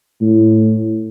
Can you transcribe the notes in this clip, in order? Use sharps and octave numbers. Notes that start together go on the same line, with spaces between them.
A2